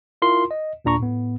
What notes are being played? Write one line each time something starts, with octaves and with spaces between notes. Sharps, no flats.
E4 F4 A#4 C6
D#5
D#2 A#2 D4 A#5 C#6
A2 B3